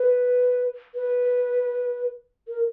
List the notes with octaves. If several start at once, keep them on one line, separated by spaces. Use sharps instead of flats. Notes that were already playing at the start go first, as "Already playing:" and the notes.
Already playing: B4
B4
A#4